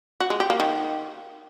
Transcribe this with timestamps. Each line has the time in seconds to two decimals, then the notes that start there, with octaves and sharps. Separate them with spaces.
0.20 F#4
0.30 G#3
0.40 G4
0.50 A#3
0.60 D#3